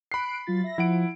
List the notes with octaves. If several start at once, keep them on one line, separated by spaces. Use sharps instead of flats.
B5 F#6 C7 D7
F#3 F4 A6
E5 A#6
F3 E4 F#5 D7